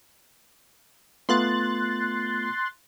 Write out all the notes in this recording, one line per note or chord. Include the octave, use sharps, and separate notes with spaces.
A3 B3 F4 C6 F#6 A6